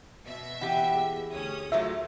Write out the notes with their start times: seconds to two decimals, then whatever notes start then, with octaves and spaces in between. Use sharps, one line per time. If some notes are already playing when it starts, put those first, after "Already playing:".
0.25 B2 E5
0.61 E3 G4 F#5 G5
0.95 G#4
1.32 D2 C#4 D#6
1.72 D#3 F3 F#3 A3 E5